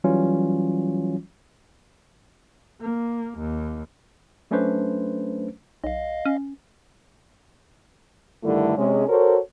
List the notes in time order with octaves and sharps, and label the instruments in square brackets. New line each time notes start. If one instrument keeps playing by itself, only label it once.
[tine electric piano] E3 F#3 G3 C#4 F4
[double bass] A#3
D#2
[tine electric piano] F#3 A3 C#4 D4 B4 C5
[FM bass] B1 [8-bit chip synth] D#5 F5
[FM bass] C#4
[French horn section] G2 D3 D#3 G3 A3 E4
C3 G#3 C#4
F#4 A4 A#4 C5 C#5